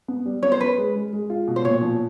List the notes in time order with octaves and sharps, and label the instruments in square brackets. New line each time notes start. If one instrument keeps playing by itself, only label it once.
[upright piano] B3
G3
[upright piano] B3 [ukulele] C#5
[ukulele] C5
[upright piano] C#4 [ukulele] B4
[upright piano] G#3
G#3
G#3
F4
B2
[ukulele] C5
[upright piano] A#2 [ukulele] C#5
[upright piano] F3